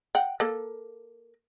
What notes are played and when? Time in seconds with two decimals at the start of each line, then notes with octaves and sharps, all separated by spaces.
0.15 F#5 G5
0.40 A#3 A4